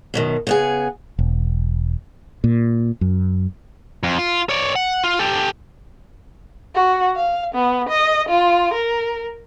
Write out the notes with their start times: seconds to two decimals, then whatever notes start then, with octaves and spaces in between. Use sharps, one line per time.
0.14 F#2 B2 D#3
0.47 C#3 B3 G#4
1.19 E1
2.44 A#2
3.01 F#2
4.03 F2
4.18 F4
4.49 C#5 D5
4.76 F#5
5.04 F4
5.19 G4 A4
6.75 F#4
7.16 F5
7.55 B3
7.89 D#5
8.29 F4
8.74 A#4